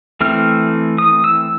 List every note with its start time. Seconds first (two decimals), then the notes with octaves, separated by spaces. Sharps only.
0.21 E3 A3 C4 F6
0.98 D#6
1.24 E6